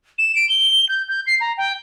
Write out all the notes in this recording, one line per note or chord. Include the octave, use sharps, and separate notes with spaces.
E7
D7
G7
G6
G6
C7
A#5
G5